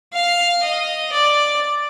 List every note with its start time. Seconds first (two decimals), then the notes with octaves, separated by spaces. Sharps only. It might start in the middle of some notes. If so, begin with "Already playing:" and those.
0.13 F5
0.63 D#5
1.12 D5